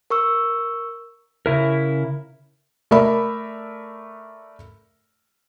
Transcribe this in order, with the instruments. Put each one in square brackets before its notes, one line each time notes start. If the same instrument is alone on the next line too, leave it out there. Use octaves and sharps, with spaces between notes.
[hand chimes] A#4 C#6 E6
[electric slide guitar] C#3 E4 A#4
[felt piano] A3 A#4 D5 E5 B5